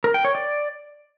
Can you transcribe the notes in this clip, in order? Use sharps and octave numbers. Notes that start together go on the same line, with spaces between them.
A#4
G5
C#5
D5